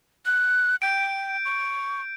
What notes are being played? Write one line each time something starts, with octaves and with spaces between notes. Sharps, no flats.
F#6
G5 G6 D7
C#6